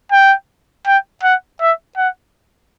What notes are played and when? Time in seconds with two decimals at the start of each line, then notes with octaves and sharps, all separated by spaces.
0.12 G5
0.87 G5
1.23 F#5
1.61 E5
1.97 F#5